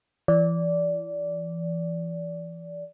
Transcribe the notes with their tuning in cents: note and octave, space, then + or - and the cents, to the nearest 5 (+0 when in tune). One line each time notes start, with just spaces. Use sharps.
E3 +30 D5 -15